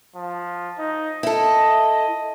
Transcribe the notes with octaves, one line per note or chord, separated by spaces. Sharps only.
F3
D#4
E4 A4 D#5